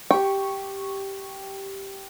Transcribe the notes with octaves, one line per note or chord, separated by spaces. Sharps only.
G4 G5 C#6